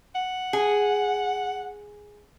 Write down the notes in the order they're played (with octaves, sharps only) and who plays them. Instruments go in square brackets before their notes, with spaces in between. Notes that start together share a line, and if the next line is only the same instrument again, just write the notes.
[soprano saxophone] F#5
[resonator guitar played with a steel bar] G#4